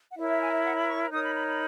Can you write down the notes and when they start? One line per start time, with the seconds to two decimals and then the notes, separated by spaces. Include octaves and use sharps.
0.09 F#5
0.16 E4 A#4 C#5 E5
0.28 E5
0.41 G#5
0.52 E5
0.64 F#5
0.75 B5
0.88 C#6
1.11 D#4 A#4 C#5 D#6
1.23 B5
1.35 B5
1.47 B5